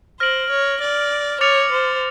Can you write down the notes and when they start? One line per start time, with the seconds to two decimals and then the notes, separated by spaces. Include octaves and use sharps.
0.20 C5 F6 A#6 D7 F#7
0.50 C#5
0.81 D5
1.41 C#5 D6 F6 A6 C#7 F7
1.72 C5